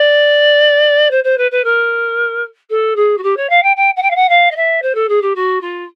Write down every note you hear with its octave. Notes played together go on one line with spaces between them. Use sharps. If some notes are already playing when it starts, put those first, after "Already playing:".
Already playing: D5
C5
C5
B4
B4
A#4
A4
G#4
F#4
G4
C#5
F5
G5
G5
F#5
G5
F5
F#5
F5
D#5
E5
C5
A4
G#4
G4
F#4
F4